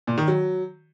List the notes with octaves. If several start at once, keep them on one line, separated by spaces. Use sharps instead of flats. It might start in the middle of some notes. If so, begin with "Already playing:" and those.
A#2
D#3
F#3